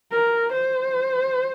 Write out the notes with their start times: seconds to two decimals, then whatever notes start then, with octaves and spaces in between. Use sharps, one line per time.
0.12 A#4
0.53 C5